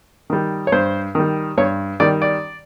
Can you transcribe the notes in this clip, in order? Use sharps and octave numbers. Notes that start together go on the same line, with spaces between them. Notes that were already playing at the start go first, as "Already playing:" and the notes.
D#3 G3
C#5
G2 C5
D#3 G3
G2 C#5
D#3 G3 D5
D5